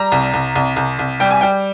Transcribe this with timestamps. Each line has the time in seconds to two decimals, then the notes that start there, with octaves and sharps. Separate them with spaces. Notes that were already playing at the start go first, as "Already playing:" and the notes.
Already playing: G3 A#5
0.12 C2
0.34 C2
0.56 C2
0.76 C2
0.99 C2
1.20 G3 G5
1.31 G#5
1.41 G3 G5